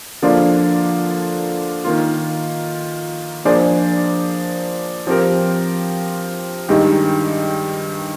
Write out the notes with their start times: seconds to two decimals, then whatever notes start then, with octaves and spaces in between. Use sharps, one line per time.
0.22 D3 F3 A#3 D4 F4
1.84 D#3 A#3 F4
3.45 F3 A#3 D4 G#4 C5
5.07 F3 C4 G4 A#4
6.68 G2 D#3 G#3 D#4 G4